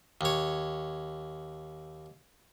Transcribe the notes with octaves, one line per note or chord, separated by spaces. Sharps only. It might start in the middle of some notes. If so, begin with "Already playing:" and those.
D#2 C#5